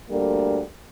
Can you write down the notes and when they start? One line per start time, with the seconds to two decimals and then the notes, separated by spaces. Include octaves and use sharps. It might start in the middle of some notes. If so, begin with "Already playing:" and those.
0.09 D2 D3 G3 A#3